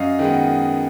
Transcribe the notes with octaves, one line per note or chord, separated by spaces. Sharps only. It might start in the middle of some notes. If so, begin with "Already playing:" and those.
Already playing: F#2 D#5 F5
D#3 G#3 B3